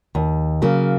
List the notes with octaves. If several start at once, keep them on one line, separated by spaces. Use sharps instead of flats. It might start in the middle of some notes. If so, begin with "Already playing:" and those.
D#2
C#3 F#3 A#3